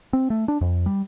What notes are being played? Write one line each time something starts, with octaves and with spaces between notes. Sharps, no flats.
C4
A3
D4
F2
G3